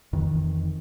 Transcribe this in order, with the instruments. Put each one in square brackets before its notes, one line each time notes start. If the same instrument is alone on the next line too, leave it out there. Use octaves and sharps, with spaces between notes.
[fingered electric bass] F2 D#3 E3